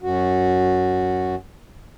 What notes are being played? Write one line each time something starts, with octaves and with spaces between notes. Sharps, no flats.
F#2 F#4